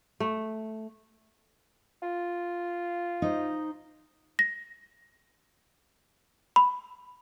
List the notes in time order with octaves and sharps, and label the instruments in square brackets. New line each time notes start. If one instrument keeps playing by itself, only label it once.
[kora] A3
[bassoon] F4
[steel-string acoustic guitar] D#4 C5
[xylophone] A#6
B5